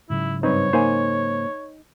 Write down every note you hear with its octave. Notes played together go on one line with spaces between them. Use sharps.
G#2 C#3 F#3 E4
G2 C4 D#4 B4 C#5
A#3 D#4 C5 G#5